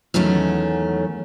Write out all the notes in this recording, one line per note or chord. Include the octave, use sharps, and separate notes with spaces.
E2 D#3 F#3 A3 C#4